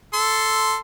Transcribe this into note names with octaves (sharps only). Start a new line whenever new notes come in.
A4 C6